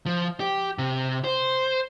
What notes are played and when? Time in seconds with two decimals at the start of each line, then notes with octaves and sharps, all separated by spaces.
0.06 F3
0.40 G4
0.78 C3
1.24 C5